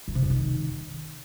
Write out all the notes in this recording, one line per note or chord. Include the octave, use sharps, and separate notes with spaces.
F#2
C3
F2
D#3